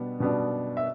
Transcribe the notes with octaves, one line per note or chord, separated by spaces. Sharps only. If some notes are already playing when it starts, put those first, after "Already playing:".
Already playing: B2 G3 B3 D4
B2 G3 B3 D4
E5